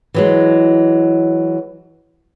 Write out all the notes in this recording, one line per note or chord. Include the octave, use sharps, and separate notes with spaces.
E3 F#3 G#3